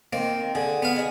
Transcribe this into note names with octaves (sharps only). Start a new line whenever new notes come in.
D#3 A#3 C4
D3 G#4
B3 F5
D#4 G#4